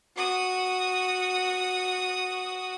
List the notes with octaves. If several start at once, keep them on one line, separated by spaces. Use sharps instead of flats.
F#4 D#6